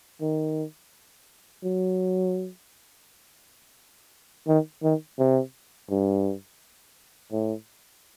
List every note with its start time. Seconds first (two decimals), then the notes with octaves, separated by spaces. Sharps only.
0.21 D#3
1.64 F#3
4.47 D#3
4.83 D#3
5.19 C3
5.90 G2
7.32 A2